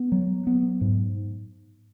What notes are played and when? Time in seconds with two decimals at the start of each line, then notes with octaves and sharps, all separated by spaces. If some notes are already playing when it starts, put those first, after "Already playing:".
Already playing: B3
0.12 F#3
0.47 B3
0.81 G#2